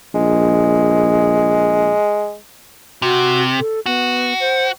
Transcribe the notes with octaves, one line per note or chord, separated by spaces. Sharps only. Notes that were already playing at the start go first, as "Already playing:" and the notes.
A#1 G#3
C3 F#4
A4
B3 F#4
C5